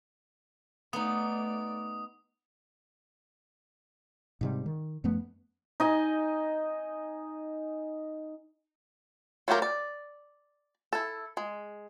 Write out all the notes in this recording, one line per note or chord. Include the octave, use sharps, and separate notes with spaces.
A3 B3 D#4 D5 D#6
G#2 C3 G3
D#3
F#2 F3 A3 B3
D#4 D#5 G#5
F#3 A3 F4 G4 A#4
D5
E4 A4
G#3